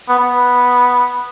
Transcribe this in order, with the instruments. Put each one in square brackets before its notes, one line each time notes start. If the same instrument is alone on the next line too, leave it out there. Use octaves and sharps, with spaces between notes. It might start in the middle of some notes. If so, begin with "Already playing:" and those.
[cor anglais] B3
B3